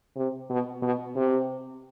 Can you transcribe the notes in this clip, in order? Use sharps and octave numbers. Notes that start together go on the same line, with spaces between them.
C3
B2
B2
C3